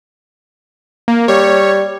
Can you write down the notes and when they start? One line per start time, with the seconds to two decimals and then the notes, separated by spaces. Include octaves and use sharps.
1.08 A#3
1.28 G3 C#5